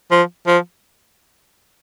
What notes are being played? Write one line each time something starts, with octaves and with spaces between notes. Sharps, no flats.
F3
F3